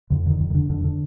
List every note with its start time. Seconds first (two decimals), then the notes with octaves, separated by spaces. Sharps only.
0.10 F2 D3
0.26 D3 D#3
0.40 F2
0.50 D#3
0.55 D3
0.70 F2 D3
0.84 D3